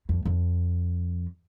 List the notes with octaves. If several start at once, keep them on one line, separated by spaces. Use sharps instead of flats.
F2
F2